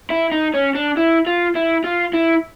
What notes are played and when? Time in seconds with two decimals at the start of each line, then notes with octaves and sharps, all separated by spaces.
0.10 E4
0.32 D#4
0.54 C#4
0.75 D4
0.97 E4
1.27 F4
1.55 E4
1.84 F4
2.13 E4